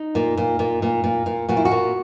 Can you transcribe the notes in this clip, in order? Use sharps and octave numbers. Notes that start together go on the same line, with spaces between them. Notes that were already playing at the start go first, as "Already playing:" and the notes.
Already playing: D#4
A#2
A#2
A#2
A#2
A#2
A#2
A#2 F#4
E4
F#4
A#2